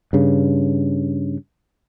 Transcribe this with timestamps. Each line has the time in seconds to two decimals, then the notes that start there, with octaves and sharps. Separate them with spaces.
0.13 G2 C#3